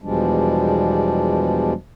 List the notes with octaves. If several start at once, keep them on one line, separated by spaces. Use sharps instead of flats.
E2 B2 F3 G3 G#3 D4